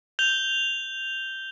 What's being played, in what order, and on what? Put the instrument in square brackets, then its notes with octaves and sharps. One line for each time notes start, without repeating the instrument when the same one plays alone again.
[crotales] G6 F7 G7